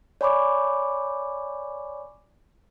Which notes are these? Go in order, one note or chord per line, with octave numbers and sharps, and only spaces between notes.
C#5 D5 G#5 B5 C#6 D6